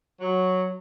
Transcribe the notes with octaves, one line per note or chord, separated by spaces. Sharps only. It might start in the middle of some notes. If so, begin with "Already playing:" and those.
F#3